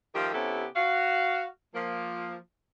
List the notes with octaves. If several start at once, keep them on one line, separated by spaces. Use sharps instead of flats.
D#3 F3 A3 G4
C3 B3 C#4 E4 G4 A4
F#4 F5
F3 A#3